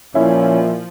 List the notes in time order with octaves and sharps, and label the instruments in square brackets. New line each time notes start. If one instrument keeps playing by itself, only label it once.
[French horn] A#2 [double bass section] F3 [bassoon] C#4 [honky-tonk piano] E4